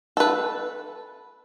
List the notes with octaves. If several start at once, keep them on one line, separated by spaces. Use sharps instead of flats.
A4 B4